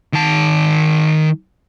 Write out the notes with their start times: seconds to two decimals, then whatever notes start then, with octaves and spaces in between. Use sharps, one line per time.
0.13 D#3 A5